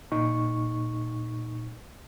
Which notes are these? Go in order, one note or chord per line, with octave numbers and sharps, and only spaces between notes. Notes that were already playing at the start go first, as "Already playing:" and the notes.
A#2 D#4 C#6